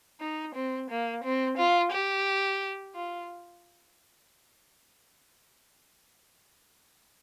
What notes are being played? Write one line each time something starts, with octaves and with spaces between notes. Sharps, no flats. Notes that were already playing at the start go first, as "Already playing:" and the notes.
D#4
C4
A#3
C4
F4
G4
F4